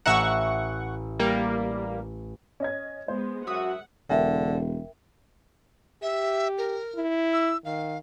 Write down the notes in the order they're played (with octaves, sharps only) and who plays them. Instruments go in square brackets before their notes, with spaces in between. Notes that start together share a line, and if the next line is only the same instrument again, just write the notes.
[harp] A1 E5 A#5 [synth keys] F#5 C#6
[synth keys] G3 A#3
[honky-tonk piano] C#4 D#5 G#6
[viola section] G#3 B3 [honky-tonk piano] C5
[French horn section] F#2 F#4 [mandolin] E5 D#6 [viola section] F#5
[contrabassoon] E1 [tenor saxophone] D3 [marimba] A#4 E5 G5
[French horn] G4 [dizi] E5
[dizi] A#4
[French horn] E4
[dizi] E6
[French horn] D#3 [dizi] F5